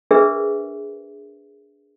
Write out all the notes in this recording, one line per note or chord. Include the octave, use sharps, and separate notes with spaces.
D4 G4 G#4 A#4 B4 E5